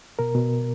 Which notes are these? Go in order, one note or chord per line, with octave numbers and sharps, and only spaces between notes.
B2 A#4
B2